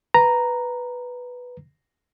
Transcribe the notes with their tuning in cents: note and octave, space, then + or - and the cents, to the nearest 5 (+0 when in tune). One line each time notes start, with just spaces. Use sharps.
B4 +0 A#5 +0